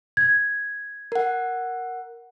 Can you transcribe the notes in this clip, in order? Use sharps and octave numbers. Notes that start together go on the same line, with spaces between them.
G#6
A#4 F#5